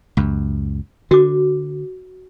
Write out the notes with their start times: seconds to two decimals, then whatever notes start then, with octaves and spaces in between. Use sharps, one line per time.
0.17 C#2 F#2
1.11 D3 F#4 D6